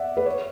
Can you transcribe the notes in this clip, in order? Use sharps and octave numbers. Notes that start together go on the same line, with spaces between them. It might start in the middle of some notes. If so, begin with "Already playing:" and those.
Already playing: D5 E5 F#5
B4
C#5